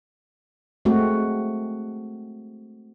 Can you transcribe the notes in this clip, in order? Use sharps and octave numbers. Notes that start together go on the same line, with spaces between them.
G#3 A3 C4 F#4